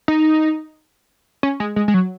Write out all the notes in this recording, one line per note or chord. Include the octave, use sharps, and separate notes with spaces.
D#4
C#4
G#3
G#3
G#3
F#3